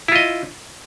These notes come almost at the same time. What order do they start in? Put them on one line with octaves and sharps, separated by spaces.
E4 F4 D#5